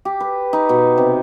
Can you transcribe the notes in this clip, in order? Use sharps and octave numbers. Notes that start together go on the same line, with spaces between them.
G4
B4
D#4
B2
C3